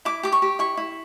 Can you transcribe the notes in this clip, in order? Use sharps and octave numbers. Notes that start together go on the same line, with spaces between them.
E4 D6
G4 D6
C#6
G4
E4 C#6
E4